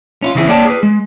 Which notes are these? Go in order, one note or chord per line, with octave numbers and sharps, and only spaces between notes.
C#4 E4 F4
C#3 E3 C4 E4 G#4
A#3 C#5 D5 G5 A5
G#4 B4
G#3